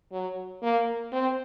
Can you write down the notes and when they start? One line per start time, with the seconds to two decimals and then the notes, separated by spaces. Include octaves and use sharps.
0.12 F#3
0.63 A#3
1.13 C4